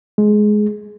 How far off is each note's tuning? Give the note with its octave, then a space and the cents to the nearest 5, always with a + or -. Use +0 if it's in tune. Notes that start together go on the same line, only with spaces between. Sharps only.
G#3 +15